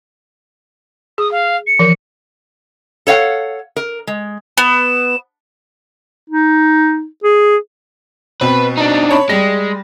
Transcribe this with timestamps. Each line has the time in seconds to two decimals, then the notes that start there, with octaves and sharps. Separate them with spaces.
1.18 G#4 D#6
1.31 F5
1.67 C#7
1.79 E3 F3 A#4
3.07 A4 C#5 F5 F#5
3.76 A#4
4.07 G#3
4.58 B3 E7
6.30 D#4
7.24 G#4
8.41 B2 C4 B4
8.77 D4 D#4
9.11 C#5 A5 B5
9.29 G3 G#3 A#6